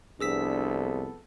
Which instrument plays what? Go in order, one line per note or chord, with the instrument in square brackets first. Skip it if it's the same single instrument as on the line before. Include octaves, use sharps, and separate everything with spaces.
[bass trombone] C2 [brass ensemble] F2 B3 A4 [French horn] D4 [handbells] G#4 E6 B6